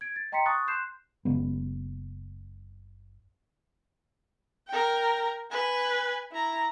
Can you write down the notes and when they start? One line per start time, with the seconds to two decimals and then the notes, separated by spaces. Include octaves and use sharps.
0.01 G#6 D7
0.16 A6
0.32 D#5 G5 A#5 C6 B6 C#7
0.46 A5 C#6 D#6 F#6 A6
0.67 C6 F#6 G6 C7 E7
1.25 F#1 C#3 G#3 B3
4.68 A#4 G5
5.51 B4 G#5
6.32 E4 A#5